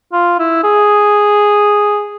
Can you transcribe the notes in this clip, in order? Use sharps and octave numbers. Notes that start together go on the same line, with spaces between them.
F4
E4
G#4